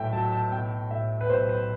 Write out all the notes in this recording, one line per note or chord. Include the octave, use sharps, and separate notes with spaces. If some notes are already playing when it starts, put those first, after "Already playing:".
Already playing: B1 A2 F#3 E5 G5
F#3 A5
A5
B1 G5
A2 E5
B4
B1 C5
B4